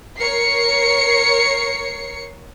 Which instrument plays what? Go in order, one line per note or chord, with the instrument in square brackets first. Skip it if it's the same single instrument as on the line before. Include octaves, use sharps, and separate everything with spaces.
[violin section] A#4 C#5 C7 C#7